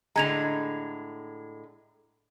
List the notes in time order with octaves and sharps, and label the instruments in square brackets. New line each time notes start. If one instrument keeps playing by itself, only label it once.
[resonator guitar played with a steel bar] A2 D3 G#3 [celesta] A#5 G#6 F7